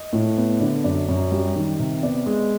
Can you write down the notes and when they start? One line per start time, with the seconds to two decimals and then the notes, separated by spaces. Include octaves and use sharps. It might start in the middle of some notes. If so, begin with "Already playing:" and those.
Already playing: D#5
0.13 A2
0.37 B3
0.60 D3 D5
0.84 F#2 D5
1.09 F#2
1.32 G3
1.56 D#3
1.79 C3
2.03 B3 D5
2.26 G#3